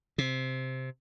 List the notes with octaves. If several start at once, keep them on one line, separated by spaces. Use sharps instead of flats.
C3